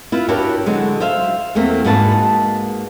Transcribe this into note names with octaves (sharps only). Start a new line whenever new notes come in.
E4 F4 B4
D4 E4 F#4 G4 A#4 C#5
D3 F#3 G#3
C5 E5 F5
E2 A3 A#3 C4
G#2 A#3 F#4 G#4 B4 A5